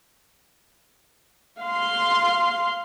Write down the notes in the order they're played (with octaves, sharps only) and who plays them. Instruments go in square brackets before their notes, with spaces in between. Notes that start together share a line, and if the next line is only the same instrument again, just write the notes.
[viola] F5 C6